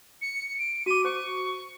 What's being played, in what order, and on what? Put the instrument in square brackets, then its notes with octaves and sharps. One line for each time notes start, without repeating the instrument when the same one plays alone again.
[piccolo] C#7
D7
[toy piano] F#4 D6 [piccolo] D#7
[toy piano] C5 [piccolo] C#6